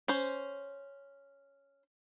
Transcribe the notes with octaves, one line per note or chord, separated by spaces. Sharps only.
C#4 C5